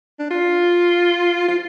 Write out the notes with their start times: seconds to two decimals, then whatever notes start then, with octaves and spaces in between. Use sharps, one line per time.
0.19 D4
0.31 F4
1.48 F4